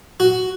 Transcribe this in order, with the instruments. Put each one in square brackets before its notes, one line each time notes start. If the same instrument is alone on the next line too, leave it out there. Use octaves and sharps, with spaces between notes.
[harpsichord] F#4